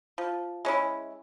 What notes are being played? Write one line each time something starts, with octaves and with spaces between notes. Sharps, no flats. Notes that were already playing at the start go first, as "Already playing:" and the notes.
F3
G#3 C#4 E4